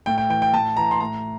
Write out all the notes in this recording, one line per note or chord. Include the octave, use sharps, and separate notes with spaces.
A2 G5
G5
E3 G5
G5
A2 A5
E3 A#5
C6
A2 A#5